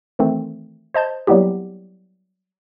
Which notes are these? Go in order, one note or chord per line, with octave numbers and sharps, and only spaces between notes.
D#3 E3 A3 C4
C5 D#5 A5 G6
F#3 G3 A#3 B3 E4 G4